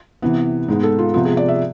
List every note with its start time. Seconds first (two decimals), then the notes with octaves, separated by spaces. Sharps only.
0.22 C3 E3 B3
0.68 G#2 G#3 B3
0.83 A4
0.99 F4
1.14 C3 F3 B3 F4
1.25 G#4
1.37 D5
1.48 E5